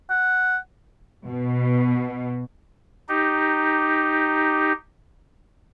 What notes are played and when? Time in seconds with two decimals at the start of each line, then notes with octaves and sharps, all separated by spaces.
0.10 F#5
1.28 B2
3.09 D#4 G4